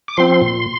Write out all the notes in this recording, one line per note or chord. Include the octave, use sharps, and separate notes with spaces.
D6
F3 C4 C6
A#2